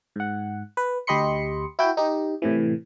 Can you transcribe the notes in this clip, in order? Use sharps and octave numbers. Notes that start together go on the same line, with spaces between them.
G#2 F#5
B4
D2 G4 D#5 B5 C6 C#7
E4 F#4 G5
D#4 G4
A2 C3 E3